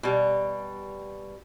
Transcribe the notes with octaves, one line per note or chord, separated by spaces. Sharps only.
B2 G3